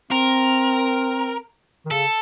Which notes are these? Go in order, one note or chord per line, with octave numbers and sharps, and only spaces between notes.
C4 A#4
D#3
C#3 A4